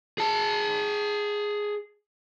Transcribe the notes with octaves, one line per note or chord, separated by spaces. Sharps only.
G#4 A5